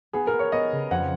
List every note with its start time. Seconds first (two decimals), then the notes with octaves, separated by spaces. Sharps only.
0.13 B3 G#4
0.27 A#4
0.33 B3
0.39 C#5
0.52 B3 D#5
0.72 C#3
0.91 F2 F#5